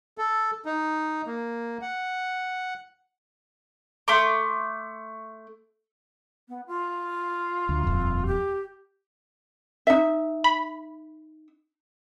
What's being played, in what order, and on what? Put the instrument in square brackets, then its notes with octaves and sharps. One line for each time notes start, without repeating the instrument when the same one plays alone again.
[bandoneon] A4
D#4
A#3
F#5
[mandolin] A3 C6 D6
[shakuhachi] B3
F4
[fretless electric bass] D2
D#1 F2
[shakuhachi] G4
[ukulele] D#4 E5
[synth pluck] B5